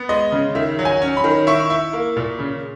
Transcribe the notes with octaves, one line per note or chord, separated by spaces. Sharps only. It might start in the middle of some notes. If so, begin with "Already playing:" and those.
Already playing: B3
G#3 D#5
C#3
D#3 E5
F#3
G#5
C#4
B5
D#3
E4 C#6
E4
A#3
A#2
C#3